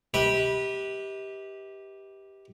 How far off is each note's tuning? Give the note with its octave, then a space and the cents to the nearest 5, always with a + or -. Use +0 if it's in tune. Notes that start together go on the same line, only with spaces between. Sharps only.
G4 +0 B4 -20 D#5 +45